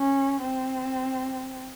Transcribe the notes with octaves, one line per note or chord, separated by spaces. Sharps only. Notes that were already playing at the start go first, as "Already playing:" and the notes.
Already playing: C#4
C4